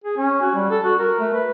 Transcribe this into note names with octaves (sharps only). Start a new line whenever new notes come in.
G#4
C#4
F#4
G3
A4
F#4
A#4
A3
B4